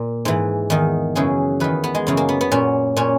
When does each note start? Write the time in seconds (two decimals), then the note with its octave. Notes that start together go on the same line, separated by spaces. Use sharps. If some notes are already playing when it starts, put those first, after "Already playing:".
Already playing: A#2
0.25 G#2 E3
0.70 E2 D#3
1.15 F#2 C#3 E3 G#4
1.60 E2 D#3 B4
1.84 B3
1.95 G#3
2.07 F#2 C#3 E3
2.17 A#3
2.29 B3
2.41 B3
2.52 A#2 C#4
2.96 A#2 C#4